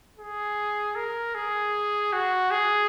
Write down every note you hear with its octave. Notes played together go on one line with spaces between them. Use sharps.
G#4
A#4
G#4
F#4
G#4